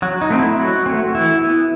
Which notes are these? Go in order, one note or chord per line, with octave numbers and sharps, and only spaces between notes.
F#3 F#4
D#4
A3 C4
E4
F#3 F#4
A3 C4
E3 E4
B3